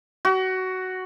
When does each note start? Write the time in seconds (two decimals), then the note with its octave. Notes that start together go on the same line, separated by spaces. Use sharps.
0.25 F#4